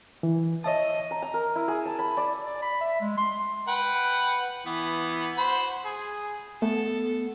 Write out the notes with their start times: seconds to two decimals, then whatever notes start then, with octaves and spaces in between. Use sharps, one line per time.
0.23 E3
0.64 C#5 D#5 E5 A5
1.11 A#5
1.22 A#5
1.34 A#4
1.56 E4
1.68 G#4
1.85 A5
1.99 B5
2.17 D5
2.46 D5
2.62 B5
2.81 E5
3.01 G#3
3.18 C6
3.68 B4 F#5 G5
4.66 E3 B3
5.38 F#4 C5 B5
5.85 G#4
6.62 A3 B3 A4